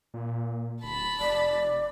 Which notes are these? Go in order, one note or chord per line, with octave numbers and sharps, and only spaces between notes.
A#2
D1 A5 B5
F1 D5